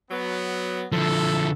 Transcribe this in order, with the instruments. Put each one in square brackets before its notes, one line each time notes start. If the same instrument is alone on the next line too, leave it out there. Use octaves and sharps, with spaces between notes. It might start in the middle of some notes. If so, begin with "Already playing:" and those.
[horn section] F#3 B3
[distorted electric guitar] D3 F3 [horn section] E4 A4